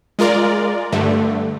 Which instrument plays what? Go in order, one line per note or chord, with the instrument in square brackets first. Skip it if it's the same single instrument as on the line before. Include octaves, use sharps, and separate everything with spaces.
[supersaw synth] G#3 F4 A#4 D5
G2 D3 A3